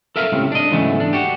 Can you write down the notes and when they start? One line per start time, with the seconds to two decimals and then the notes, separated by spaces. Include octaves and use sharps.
0.16 A4 A#4 E5 F5
0.32 C#2 A2 C3
0.52 D4 D#5
0.71 G#2 C#3 E3 F#3 A3 B3
1.00 D4
1.13 F#4 G4